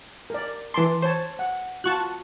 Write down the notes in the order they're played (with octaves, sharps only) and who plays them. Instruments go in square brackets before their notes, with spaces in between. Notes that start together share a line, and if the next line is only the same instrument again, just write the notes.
[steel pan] A#4 D5
[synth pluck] E3 C6 [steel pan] A5 D6
[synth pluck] C5 [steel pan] C#5 A5
[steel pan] F#5
[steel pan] F4 F#4 [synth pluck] A5 C#6 F#6